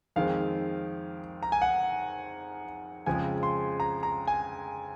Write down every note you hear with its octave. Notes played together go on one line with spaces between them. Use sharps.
F2 D#3 G#3 C4 F5
A#5
G#5
F#5
F2 C#3 F3 G#3 G#5
C6
A#5
A#5
G#5